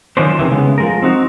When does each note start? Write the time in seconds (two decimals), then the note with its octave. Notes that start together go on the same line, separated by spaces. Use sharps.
0.17 D#3 F3 F#3 C#4 D4 C5
0.39 C3 D#3 E3
0.51 C#3 G#3 B3
0.78 F3 G#3 A#4
1.02 C4 D#4 F#4